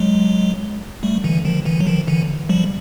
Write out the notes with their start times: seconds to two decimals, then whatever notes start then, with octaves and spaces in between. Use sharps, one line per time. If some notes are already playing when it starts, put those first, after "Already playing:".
Already playing: F#3 G#3
1.03 G3 A3
1.24 D3 E3
1.45 D#3 F3
1.65 D3 E3
1.80 F#3
1.87 D#3 F3
2.08 D3 E3
2.49 F3 G3